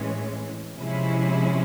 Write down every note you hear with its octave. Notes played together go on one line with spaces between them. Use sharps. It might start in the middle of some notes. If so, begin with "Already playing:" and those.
Already playing: A2 E3 G#3 C#4
C3 F3 G#3 C#4 E4